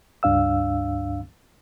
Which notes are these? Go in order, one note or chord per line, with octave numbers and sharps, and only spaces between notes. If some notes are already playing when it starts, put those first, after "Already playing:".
C#2 G2 D4 F5 E6